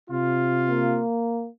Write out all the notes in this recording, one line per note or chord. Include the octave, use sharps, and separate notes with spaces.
C3 F4
A#3